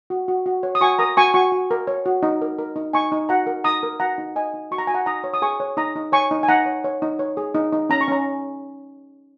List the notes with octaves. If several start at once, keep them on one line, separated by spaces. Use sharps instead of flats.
F#4
F#4
F#4
C#5
D#6
F#4 G#5 C#6
A#4 A#5 D#6
F#4 G#5 C#6
F#4 G#5 C#6
F#4
A#4
C#5
F#4
D#4
A#4
A#4
D#4
D#4 G#5 C#6
D#4
F#4 F#5 A#5
A#4
D#4 A#5 D#6
A#4
F#4 F#5 A#5
D#4
D#4 D#5 G#5
D#4
F#4 C#6
A#5
F#4 G#5
F#5 A#5
D#4 A#5 D#6
C#5
D#6
G#4 G#5 C#6
C#5
D#4 A#5 D#6
D#4
C#5 G#5 C#6
D#4
G#5
D#4 F#5 A#5
C#5
C#5
D#4
C#5
G#4
D#4
D#4
C#4 A#5
C#6
C#4 A#5